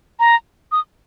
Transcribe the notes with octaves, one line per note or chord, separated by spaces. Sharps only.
A#5
D#6